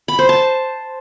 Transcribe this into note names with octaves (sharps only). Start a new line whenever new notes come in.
B5
C5
A5